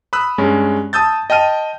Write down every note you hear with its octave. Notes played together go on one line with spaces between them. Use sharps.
B5 D#6 E6 F#6
G2 G#3 C#4
A5 D#6 E6 G6 A6
D#5 G5 A5 F6 D#7